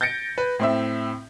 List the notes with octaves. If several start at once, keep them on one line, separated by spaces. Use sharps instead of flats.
G6 A6 A#6 C#7 D7
B4
A2 C4 E5